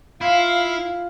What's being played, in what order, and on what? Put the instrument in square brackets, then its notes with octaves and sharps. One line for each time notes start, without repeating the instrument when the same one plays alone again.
[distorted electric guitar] E4 [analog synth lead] F4 [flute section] F5